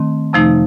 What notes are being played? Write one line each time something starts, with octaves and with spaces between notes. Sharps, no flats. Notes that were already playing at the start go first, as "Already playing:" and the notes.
Already playing: D#3 A3 C4
F2 C3 F3 A3 D#4